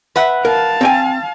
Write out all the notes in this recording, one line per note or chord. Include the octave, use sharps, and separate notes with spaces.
B4 E5 F#5
A#4 F5 A5
C4 G5 G#5